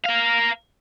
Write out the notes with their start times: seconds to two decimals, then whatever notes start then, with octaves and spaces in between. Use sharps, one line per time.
0.04 A#4 F5